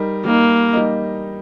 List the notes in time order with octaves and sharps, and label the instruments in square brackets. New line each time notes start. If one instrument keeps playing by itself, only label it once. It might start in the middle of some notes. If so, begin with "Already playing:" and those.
Already playing: [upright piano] G3 D#4 A#4 D#5
[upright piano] G3 D#4 A#4 D#5 [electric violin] A#3
[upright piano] G3 D#4 A#4 D#5